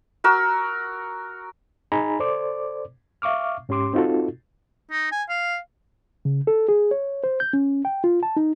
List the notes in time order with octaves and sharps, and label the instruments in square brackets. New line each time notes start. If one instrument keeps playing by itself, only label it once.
[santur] F#4 A#4 E6
[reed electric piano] D#4 G#4 D#5 G#5 A#5 B5
A4 C5 D5 D6
E5 F5 C#6 D6 F6
G#2 C#4 G4 C6 D6
C4 D#4 F4 F#4 A4
[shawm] D#4
G#5
F5
[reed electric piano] C#3
A4
G#4
C#5
C5
G6
C#4
G5
F4
A5
D#4